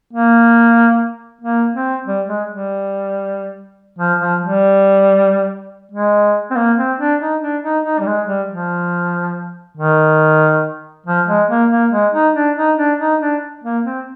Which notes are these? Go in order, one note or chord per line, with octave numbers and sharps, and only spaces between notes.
A#3
A#3
C4
G3
G#3
G3
F3
F3
G3
G#3
C4
A#3
C4
D4
D#4
D4
D#4
D#4
G3
G#3
G3
F3
D#3
F3
G#3
A#3
A#3
G#3
D#4
D4
D#4
D4
D#4
D4
A#3
C4